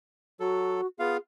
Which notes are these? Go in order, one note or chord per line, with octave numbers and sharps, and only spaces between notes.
F#3 F#4 A4
B3 F4 G#4 F5